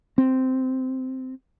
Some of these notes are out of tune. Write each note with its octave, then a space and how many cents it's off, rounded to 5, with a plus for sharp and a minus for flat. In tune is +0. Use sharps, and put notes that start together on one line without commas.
C4 -10